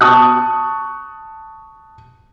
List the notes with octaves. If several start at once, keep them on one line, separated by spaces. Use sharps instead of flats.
A5 C#6 D#6 F#6